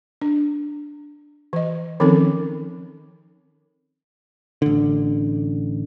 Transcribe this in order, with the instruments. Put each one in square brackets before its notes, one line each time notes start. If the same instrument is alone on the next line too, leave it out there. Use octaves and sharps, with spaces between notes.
[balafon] D4
E3 D#5
D#3 F3 C4 C#4 D#4 A4
[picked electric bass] A1 D3